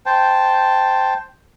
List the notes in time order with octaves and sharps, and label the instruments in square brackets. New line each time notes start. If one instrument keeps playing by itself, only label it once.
[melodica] C5 G5 A5